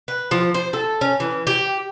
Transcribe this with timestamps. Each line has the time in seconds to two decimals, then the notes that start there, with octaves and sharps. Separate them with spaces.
0.08 B4
0.31 F3
0.54 C5
0.73 A4
1.01 C#4
1.20 E3
1.47 G4